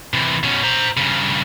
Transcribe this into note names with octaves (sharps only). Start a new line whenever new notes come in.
C3 E3
B2 C#4
C5 A#5
G2 C#3